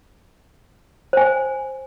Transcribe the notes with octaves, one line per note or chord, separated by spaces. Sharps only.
C5 G#5